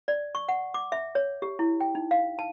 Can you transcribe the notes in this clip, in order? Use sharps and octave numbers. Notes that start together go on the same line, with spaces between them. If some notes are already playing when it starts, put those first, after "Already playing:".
D5
C#6
F#5
D6
E5
C#5
G4
E4
G5
D#4
F5
A5